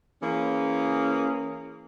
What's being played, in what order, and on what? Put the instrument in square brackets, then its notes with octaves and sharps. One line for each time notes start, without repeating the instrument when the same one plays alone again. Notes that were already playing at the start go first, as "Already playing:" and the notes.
[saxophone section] E3 A#3 C#4 G#4